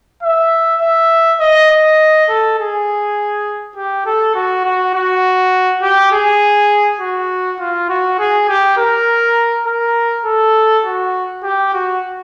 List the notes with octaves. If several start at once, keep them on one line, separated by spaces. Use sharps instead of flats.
E5
E5
D#5
D#5
A4
G#4
G4
A4
F#4
F#4
F#4
G4
G#4
F#4
F4
F#4
G#4
G4
A#4
A#4
A4
F#4
G4
F#4